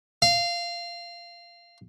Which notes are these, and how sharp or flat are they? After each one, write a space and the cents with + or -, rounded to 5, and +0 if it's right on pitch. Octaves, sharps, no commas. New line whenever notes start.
F5 -15